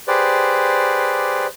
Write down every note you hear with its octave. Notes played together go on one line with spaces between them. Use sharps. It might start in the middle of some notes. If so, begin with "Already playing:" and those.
G4 G#4 B4 C5 D5